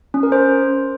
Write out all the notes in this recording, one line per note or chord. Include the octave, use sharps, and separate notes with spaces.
C#4
A#4
C5